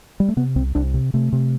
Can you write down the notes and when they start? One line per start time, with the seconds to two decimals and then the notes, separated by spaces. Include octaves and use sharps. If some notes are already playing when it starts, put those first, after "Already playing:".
0.20 G3
0.29 A3
0.37 C3 B3
0.56 C2 C4
0.75 C2 D4
0.94 C3
1.14 C3 A3
1.33 C3